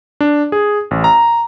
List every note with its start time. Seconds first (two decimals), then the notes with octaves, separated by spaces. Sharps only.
0.21 D4
0.52 G#4
0.91 A1
1.04 A#5